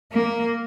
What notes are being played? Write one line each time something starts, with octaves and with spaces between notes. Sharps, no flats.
A#3